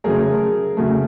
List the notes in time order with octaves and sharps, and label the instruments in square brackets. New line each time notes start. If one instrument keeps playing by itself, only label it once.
[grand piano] C#3 F#3 A3 G#4 A#4
C#3 F#3 A3